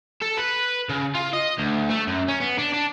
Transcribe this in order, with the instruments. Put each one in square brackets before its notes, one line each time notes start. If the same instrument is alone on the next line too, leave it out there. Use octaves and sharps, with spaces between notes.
[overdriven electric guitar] A4
B4
C#3
F4
D#5
D2
A3
F#2
C#4
B3
D4
D4